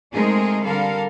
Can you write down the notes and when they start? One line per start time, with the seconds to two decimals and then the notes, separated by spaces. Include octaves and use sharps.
0.14 G#3 A3 C4 D#4 G#4 A#4
0.64 D3 G3 A4 A#4 F5